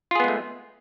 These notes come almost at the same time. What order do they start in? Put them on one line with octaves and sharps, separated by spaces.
F4 G#4 B3 G#3 A3